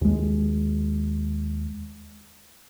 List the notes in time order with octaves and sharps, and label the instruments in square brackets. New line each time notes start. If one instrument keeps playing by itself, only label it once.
[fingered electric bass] D#2 G#3